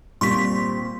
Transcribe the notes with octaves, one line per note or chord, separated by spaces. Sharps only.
A#2 G3 C4 C6 C#6 B6